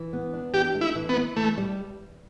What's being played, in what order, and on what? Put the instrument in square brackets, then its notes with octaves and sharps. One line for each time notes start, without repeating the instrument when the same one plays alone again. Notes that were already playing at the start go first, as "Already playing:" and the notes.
Already playing: [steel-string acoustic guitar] E3
B3
D4
[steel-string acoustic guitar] E3 [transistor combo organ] G4
[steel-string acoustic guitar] A3
[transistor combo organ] E4
[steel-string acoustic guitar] E3
[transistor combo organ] B3
[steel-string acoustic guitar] E4
[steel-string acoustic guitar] E3 [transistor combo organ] A3
[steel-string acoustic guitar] G3